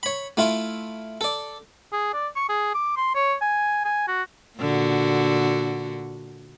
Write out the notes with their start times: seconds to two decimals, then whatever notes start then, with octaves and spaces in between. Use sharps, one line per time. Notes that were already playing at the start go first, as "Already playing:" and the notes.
0.03 C#5 B5
0.37 A3 E4 F4
1.21 A4 D5
1.92 G#4
2.14 D5
2.36 C#6
2.49 G#4
2.74 D6
2.97 C6
3.15 C#5
3.41 G#5
3.85 G#5
4.07 F#4
4.59 A#2 D3 F#4